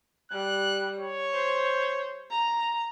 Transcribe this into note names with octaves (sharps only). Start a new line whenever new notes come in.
G3 F#6
C#5
C5
A#5